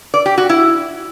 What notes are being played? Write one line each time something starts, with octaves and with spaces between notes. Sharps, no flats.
D5
G4
F#4
E4